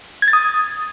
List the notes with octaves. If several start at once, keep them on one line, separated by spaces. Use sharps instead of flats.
G#6
A6
D#6